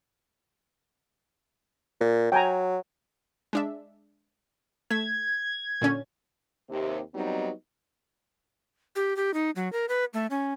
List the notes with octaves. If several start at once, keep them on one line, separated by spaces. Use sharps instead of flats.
A#2
F#3 G5 G#5 A#5
G#3 D4 E5
A3 G#6 B6 E7
A#2 D3 C#4
D#2 C3
F#3 G3 B3 C4 D#4
G4
G4
D#4
F#3
A#4
B4
A3
C#4